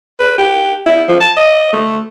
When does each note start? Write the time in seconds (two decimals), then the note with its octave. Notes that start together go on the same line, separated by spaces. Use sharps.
0.19 B4
0.38 G4
0.86 E4
1.08 F3
1.20 A5
1.37 D#5
1.73 A3